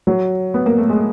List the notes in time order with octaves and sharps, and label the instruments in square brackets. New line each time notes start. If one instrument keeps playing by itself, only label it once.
[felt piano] F#3
B3
A#3
A3
G#3